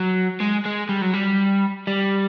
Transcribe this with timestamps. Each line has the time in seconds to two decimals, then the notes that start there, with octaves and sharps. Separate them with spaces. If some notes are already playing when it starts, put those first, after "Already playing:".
Already playing: F#3
0.40 G#3
0.66 G#3
0.89 G3
1.01 F#3
1.13 G3
1.87 G3